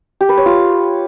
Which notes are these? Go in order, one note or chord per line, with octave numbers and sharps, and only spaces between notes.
G4
B4
C#5
F4